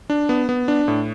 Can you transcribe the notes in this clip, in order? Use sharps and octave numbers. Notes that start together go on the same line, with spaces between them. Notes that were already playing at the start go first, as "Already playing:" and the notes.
D4
B3
B3
D4
A2